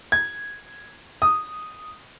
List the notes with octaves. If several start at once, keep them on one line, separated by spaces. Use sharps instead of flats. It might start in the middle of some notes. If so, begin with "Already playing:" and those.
G#6
D#6